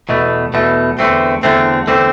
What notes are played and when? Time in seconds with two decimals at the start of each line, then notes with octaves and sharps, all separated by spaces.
0.09 E2 B2 A3
0.54 E2 B2 A3
0.99 E2 D3 A3 C4
1.43 E2 D3 A3 C4
1.87 E2 D3 A3 C4